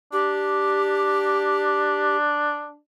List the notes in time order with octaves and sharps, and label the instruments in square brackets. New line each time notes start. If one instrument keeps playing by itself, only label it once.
[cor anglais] D4 [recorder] G4